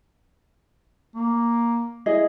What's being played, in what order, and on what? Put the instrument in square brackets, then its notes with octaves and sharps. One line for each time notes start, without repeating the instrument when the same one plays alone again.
[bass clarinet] A#3
[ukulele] E4 G#4 D#5